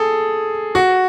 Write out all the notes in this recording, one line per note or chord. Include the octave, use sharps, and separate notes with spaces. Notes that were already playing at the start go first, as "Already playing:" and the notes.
Already playing: G#4 A4
F#4